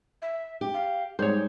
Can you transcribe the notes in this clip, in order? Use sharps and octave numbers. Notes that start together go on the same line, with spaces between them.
E5
G4
F5
G#2 G3 G#4 C5 C#5